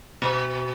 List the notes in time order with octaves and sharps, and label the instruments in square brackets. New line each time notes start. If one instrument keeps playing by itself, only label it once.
[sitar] B2